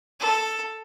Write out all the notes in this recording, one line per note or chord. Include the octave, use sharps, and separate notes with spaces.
A4